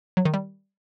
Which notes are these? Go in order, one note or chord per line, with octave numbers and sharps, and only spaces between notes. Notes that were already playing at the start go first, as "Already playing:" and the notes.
F#3
D#3
G3